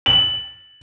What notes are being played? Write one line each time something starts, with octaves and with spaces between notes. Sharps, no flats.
F#7